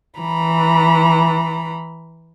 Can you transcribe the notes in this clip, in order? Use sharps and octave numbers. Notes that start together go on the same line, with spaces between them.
E3 A#5 B5